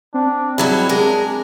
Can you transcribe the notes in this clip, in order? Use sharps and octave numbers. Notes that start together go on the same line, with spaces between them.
C4 D4
G#2 F#3 G3 E4
G#3 D4 A#4